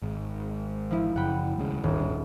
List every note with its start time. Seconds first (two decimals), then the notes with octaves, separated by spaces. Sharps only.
0.02 G#1
0.91 F3 E4
1.16 F#1 F#5 G5 B5
1.56 D#1 C#2 C#3
1.84 D#1 G#1 G2